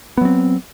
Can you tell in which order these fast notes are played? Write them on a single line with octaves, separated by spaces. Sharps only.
B3 F#3 C4